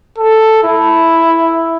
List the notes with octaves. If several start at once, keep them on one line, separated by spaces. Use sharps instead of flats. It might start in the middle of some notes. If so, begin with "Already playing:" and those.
A4
E4